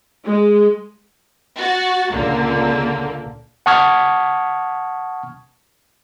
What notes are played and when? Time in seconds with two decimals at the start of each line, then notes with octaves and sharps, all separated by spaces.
0.25 G#3
1.59 F#4 A6
2.11 C#2 A#2 D3 A#3
3.66 F#5 A5 C#6 D#6 F6 G#6